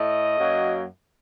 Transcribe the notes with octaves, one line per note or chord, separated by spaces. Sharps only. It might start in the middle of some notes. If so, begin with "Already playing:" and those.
Already playing: A2 A3 D#5
F#2 F#3 A#3